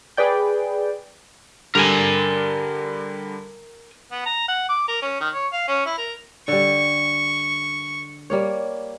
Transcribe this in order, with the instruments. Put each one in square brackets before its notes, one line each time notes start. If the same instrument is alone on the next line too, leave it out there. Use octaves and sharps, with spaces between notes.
[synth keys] G#4 B4 D5 G5
[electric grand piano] D3 G3 [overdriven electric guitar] A#4 G#5
[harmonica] B3
A#5
F#5
D6
A#4
C#4
D#3
C#5
F5
C#4
E4
A#4
[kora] D3 G3 [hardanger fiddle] C#6
[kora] G3 A#3 C#5